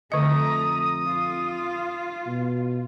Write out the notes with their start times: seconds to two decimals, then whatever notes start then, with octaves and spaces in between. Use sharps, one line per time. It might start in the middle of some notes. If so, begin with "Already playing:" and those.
0.12 F2 D3 A3 D#5 A#5 D#6
1.06 F4
2.26 B2